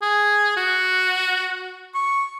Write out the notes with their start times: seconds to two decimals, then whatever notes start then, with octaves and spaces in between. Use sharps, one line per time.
0.02 G#4
0.57 F#4
1.95 C#6